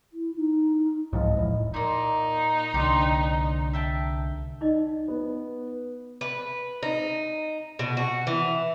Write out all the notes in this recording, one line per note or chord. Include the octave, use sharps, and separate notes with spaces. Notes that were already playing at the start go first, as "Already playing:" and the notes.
E4
D#4
C2 G#2 F3 D#5
E1 A2
A#2 A#3 D#4
C2 D3 F3 G4 C5
E5 G5 A5
D#4 D5 D#5
B3
B4
D#4
B2
F#4
E3